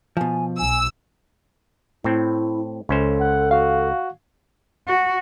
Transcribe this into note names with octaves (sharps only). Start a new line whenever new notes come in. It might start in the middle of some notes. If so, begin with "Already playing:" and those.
B2 F3 G#5
B1 G#5 E6
A2 C4 E4
C#2 C#4 A4 C5
F#5
F#4 F5
F#4